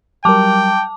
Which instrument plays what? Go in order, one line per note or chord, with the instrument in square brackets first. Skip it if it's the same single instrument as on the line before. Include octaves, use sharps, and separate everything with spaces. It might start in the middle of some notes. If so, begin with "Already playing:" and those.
[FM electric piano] F#3 G3 A#4 [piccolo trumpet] G5 [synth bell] A5 D6